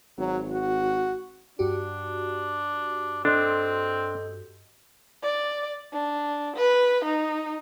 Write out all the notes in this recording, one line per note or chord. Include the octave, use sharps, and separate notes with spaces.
G#1 F#3
F#4
G2 D4 F#4 G4
C4 D4 A4 D#5 C6
D5
D4
B4
D#4